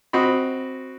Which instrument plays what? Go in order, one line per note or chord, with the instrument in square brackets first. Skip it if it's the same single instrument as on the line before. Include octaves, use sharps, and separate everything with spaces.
[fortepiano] C4 F#4 D#5 B5